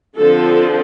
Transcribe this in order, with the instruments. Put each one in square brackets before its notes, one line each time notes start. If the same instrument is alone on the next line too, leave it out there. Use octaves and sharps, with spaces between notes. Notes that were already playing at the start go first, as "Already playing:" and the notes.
[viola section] D3 F3 C4 A4